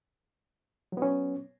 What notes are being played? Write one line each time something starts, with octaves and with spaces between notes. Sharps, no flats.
F#3 B3 C#4